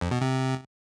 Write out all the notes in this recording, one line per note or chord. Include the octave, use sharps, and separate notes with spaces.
F2
B2
C3